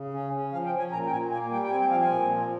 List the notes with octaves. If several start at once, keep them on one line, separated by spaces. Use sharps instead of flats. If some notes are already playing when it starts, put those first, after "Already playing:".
Already playing: C#3
C#4
C#4
F3 F5
G5
C#4
G#5
A#2 A#5
G5
A#2 G#5
A#3 G#5
G3 G5
G5
C4 G#5
G5
F3 F5
G#5
A#2
F3